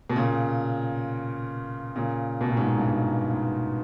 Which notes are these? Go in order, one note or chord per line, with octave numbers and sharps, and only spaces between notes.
B2
A#2 C#3
A#2 C#3
B2
A#2
G#2 B2
G2
G#2
G#2